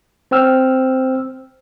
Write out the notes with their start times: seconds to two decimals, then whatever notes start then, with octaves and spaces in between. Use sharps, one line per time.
0.31 C4 C5 G5 E6 F6